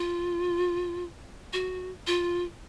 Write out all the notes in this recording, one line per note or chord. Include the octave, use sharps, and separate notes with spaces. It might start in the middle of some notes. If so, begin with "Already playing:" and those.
Already playing: F4
F#4
F4